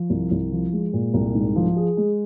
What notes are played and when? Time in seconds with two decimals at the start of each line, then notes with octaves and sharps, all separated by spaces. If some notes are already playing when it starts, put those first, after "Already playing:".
Already playing: F3
0.10 C2
0.31 C2
0.52 F3
0.73 G#3
0.93 A#2
1.14 C2
1.35 G#2
1.56 F3
1.76 G#4
1.97 G#3